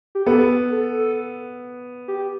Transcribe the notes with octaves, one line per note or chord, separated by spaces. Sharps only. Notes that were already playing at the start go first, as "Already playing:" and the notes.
G4
B3 A4
A4
G4